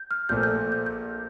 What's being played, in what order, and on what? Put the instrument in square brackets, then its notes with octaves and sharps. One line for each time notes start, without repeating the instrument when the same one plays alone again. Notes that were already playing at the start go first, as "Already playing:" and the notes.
Already playing: [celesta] G6
F6
[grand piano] A#1 A#2 A3 [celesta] G6
[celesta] G6
G6
G6